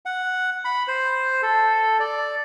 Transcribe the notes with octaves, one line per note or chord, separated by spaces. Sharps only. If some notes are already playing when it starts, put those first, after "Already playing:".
F#5
B5
C5
A4
D5